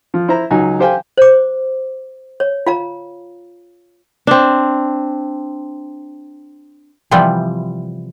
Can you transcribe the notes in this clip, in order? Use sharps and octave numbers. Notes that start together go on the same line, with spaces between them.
F3
E4 C5 A#5
C#2 F#3 D#4 F#4 G#5
G4 C5 F5 G5 G#5
C5 D6
C#5
F4 F5 A#5
C4 D4
C3 E3 F3 G3 B3